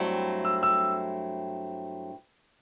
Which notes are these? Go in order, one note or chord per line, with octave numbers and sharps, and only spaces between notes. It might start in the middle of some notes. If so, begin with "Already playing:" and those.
Already playing: G2 F#3 A3 C4 E4
E6
E6